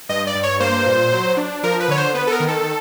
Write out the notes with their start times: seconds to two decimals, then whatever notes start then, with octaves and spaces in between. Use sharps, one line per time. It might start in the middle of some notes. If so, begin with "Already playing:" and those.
0.09 G2 D#5
0.27 D5
0.35 G2
0.43 C#5
0.60 A#3 C5
0.86 A#2
1.12 F#3
1.37 D4
1.63 F3 A#4
1.80 B4
1.88 D3 C#5
1.98 C5
2.14 B3 B4
2.27 A4
2.32 A#4
2.40 D#3
2.48 A4